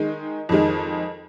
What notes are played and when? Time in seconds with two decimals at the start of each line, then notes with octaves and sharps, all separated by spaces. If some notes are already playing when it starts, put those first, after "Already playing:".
Already playing: D#3 G#3 D#4
0.49 F2 D#3 G#3